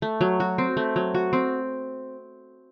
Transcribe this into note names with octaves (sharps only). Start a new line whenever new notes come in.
A3
F#3
F#4
C4
A3
F#3
F#4
C4